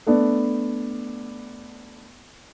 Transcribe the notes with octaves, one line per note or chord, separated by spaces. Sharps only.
A3 B3 D4